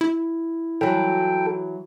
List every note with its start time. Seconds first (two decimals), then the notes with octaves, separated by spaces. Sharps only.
0.01 E4
0.81 E3 F#3 A4 G5